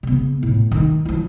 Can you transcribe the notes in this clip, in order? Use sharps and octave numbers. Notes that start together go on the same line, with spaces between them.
C#3 B3
A2
D#3 D#4
F3 E4